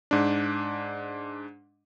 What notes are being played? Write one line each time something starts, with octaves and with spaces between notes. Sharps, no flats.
G#2 D4